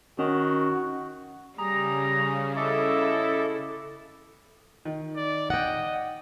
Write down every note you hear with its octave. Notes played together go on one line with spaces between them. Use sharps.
D#3 C#4 F#4
C#3 G3 G#4 A#5
E4 A4 D#5 E5 D6
D#3
D5
D#5 F#5 G5